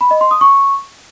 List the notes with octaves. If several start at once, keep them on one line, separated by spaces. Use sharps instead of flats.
B5
D#5
C6
D#6
C#6